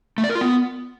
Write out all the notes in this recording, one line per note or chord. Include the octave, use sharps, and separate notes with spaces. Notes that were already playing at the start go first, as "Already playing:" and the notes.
A3
D5
A#4
F4
B3